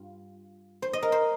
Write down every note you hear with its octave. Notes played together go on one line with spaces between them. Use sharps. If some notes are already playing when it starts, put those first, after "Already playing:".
Already playing: G2 F4
C5
D#5
A#4
C5